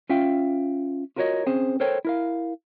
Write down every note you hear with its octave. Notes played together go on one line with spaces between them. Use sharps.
C#4 F4 E5 F5 G5
F4 F#4 A#4 B4 C#5 D#5
C4 C#4 G#4 C5
A4 A#4 C5 C#5 G5
E4 A#4 F5